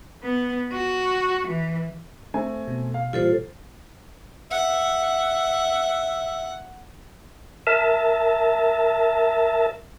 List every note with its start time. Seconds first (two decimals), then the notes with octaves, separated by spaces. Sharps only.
0.23 B3
0.73 F#4
1.47 E3
2.34 A3 C4 G#5
2.67 B2
2.94 F5
3.13 A#2 E3 G3 F4 A4 C5
4.51 E5 F#5
7.67 A#4 E5 A5